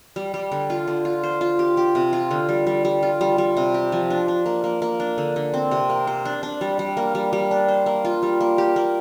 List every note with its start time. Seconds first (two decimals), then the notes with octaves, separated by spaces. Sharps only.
0.16 G3
0.34 G3
0.52 D3
0.70 F4
0.88 D3
1.05 F4
1.23 C5
1.41 F4
1.59 G4
1.77 G4
1.95 C3
2.13 F4
2.31 D3
2.49 G3
2.67 G3
2.85 G3
3.03 F4
3.21 G3
3.38 G3
3.57 C3
3.74 G4
3.92 F3
4.10 D4
4.28 D4
4.46 A#3
4.64 A#3
4.82 A#3
5.00 D4
5.18 D3
5.36 D3
5.54 C4
5.71 C3
5.90 A#3
6.07 C5
6.25 D4
6.43 D4
6.61 G3
6.79 G3
6.97 A#3
7.15 G3
7.33 G3
7.51 D4
7.68 C5
7.86 A#3
8.05 F4
8.23 G3
8.41 A#3
8.58 G4
8.76 A#3